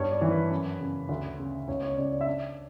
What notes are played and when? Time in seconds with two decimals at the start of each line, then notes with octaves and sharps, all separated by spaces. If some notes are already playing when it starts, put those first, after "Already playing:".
Already playing: G2 C#5
0.12 D5
0.21 E3
0.31 B4
0.50 F#2
0.80 C#3
1.09 D2
1.39 C#3
1.68 C#2 C#5
1.83 C#5
1.97 C#3 D5
2.12 D5
2.21 E5
2.26 D4 D5